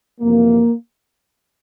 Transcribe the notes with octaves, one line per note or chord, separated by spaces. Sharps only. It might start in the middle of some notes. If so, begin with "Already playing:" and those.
F2 C3 E3 A#3